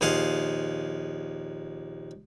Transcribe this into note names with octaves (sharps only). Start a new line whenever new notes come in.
A#1 D#2 G#4 F5 F#5 C6